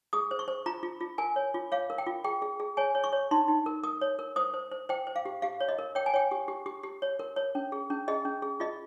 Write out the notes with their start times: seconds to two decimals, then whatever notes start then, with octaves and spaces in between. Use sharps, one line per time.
0.13 G#4 D#6
0.31 C5
0.39 C#6
0.48 C5
0.66 F4 A#5
0.83 F4
1.00 F4
1.18 A#4 G#5
1.36 C#5
1.54 F4
1.72 C#5 F5
1.90 A#4
1.98 G5
2.06 F4
2.24 G#4 G5
2.42 G#4
2.60 G#4
2.77 C#5 G#5
2.95 C#5
3.04 C#6
3.13 C#5
3.31 D#4 C6
3.48 D#4
3.66 A#4
3.83 A#4 D#6
4.01 C#5
4.19 A#4
4.36 C5 D#6
4.54 C5
4.72 C5
4.89 C5 G5
5.07 C5
5.16 F5
5.25 G4
5.42 G4 F5
5.61 C#5
5.69 D#5
5.79 A#4
5.95 C#5 G5
6.06 G#5
6.14 C#5 G5
6.31 G4
6.48 G4
6.66 G4
6.83 G4
7.02 C#5
7.19 A#4
7.36 C#5
7.55 C#4
7.72 G#4
7.90 C#4
8.08 G#4 D#5
8.25 C#4
8.42 G#4
8.60 F4 D#5